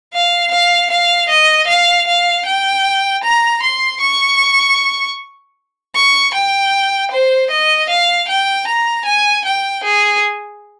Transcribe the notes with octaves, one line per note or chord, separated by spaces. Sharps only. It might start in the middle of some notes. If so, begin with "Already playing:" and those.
F5
F5
F5
D#5
F5
F5
G5
A#5
C6
C#6
C#6
G5
C5
D#5
F5
G5
A#5
G#5
G5
G#4